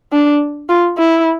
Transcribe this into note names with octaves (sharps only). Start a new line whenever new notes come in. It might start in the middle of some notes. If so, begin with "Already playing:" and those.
D4
F4
E4